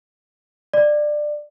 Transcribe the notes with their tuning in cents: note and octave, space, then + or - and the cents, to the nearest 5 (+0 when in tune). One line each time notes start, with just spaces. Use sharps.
D5 +20